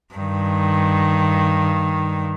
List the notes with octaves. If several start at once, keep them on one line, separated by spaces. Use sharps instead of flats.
G2 D#3